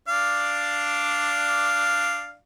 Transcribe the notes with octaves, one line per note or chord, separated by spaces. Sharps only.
D4 D5 F5